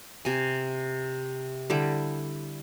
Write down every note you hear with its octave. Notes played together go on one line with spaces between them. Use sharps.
C3 G#5
D3 G3 E4